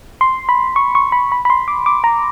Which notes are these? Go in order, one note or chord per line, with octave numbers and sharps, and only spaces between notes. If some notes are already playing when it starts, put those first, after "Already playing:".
C6
B5
C#6
C#6
B5
B5
B5
C6
D6
D6
A#5